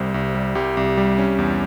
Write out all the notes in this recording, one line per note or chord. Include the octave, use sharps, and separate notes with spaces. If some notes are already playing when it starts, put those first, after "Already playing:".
Already playing: C2 G3 C5
C2
G3
C2 G4
C2
G3
C#4
E2